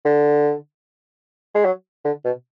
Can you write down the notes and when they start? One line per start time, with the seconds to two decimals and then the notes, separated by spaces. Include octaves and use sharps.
0.05 D3
1.55 G#3
1.65 F#3
2.05 D3
2.25 B2